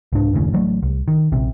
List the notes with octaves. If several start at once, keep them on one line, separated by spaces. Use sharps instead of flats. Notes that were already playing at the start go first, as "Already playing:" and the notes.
C2 G#2 D4
F#1 D#2 A2 C#3
A1 F#3 A3
C2
D#3
A#1 C3